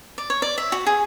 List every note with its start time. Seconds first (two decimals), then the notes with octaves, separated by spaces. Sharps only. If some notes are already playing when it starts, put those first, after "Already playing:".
0.18 D5
0.30 C#5
0.42 D5
0.58 E5
0.72 F#4
0.86 G#4